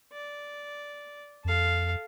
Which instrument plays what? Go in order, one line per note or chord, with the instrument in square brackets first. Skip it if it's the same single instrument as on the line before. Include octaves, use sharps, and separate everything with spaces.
[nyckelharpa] D5
[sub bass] F2 [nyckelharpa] A4 F5